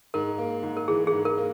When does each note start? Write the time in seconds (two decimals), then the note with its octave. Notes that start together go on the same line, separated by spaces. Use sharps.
0.14 G#2 A#4
0.38 A#3
0.63 G#2
0.77 A#4
0.88 E3 G#4
1.07 G#4
1.12 G#2
1.25 A#4
1.38 A#3